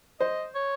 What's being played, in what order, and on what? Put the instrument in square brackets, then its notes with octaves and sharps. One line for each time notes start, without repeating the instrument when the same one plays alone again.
[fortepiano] C5 [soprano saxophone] D#5
[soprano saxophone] C#5